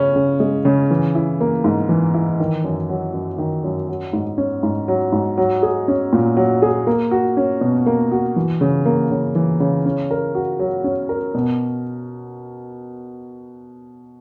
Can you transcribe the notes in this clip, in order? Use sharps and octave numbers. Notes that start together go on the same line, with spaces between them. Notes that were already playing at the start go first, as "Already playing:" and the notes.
Already playing: C#3 C#4
C#3
G#3
C#3
E3
E4
A#3
G#2
E3
E4
D#3
F#2
F#3
F#2
D#3
F#2
F#3
G#2
C#4
G#2
F#3
G#2
F#3
G#4
C#4
A#2
F#3
G#4
A#3
F#4
C#4
B2
A#3
F#4
E3
C#3
A#3
C#3
E3
C#3
C#4
A#4
F#4
F#3
C#4
A#4
B2